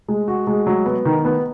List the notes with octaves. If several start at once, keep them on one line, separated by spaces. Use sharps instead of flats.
G#3
F#4
G#3
F#3
B3
D#3
B3